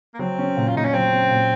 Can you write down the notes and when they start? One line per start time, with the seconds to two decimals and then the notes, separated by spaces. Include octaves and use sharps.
0.14 A#3
0.19 F#3 C4
0.39 C#4
0.57 A#2
0.68 F4
0.75 A#2 D#4
0.85 C#4
0.93 F#3 C4
1.11 C#4
1.30 A#2